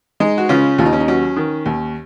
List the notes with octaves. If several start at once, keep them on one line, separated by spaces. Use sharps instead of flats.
G#3 D#4
F#4
C#3 C#4 F4
D#2 F4
D#4
C#4
D#4
F#3 C#4
D#3
D#2